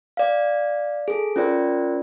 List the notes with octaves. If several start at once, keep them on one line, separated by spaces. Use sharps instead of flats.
D5 F5
G#4 A4
C#4 F4 A#4 C5 D5